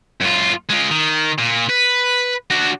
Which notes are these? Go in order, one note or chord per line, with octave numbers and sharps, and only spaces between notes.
F#2 F4
G#3 F4
D#3
A#2
B4
D4 F#4